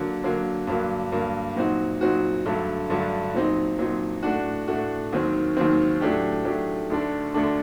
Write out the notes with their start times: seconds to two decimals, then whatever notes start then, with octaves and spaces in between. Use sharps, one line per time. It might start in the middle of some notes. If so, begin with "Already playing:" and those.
Already playing: D3 F#3 A#3
0.24 D3 F#3 A#3
0.67 G2 D3 F#3 A#3
1.12 G2 D3 F#3 A#3
1.56 A#2 F#3 C4 D#4 F#4
2.01 A#2 F#3 C4 D#4 F#4
2.45 G2 D3 F#3 A3
2.90 G2 D3 F#3 A3
3.34 A#2 F#3 C4 D#4
3.79 A#2 F#3 C4 D#4
4.23 A2 A3 D4 F#4
4.68 A2 A3 D4 F#4
5.13 D#2 D#3 F#3 C4
5.57 D#2 D#3 F#3 C4
6.01 A2 F#3 A3 D4 G4
6.45 A2 F#3 A3 D4 G4
6.90 D2 D3 A3 D4
7.34 D2 D3 A3 D4